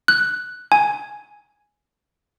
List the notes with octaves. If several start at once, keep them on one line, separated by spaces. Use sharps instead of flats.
F#6
G#5